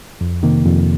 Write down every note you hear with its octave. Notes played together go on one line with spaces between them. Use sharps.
F2
C3 D#3 A#3
F2